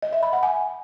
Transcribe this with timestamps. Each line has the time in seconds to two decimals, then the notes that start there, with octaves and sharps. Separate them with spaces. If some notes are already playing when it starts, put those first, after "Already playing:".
0.02 D#5
0.13 E5
0.23 B5
0.33 F#5
0.43 G#5